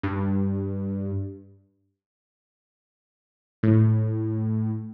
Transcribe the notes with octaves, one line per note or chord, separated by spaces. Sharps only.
G2
A2